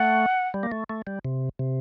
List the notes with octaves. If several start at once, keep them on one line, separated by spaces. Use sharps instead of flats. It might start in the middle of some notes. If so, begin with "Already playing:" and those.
Already playing: A3 F#5
G3
A#3
A3
A3
G3
C3
C3